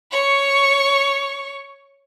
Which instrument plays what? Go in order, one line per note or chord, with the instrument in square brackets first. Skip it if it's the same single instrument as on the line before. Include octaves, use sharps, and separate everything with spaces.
[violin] C#5 C#6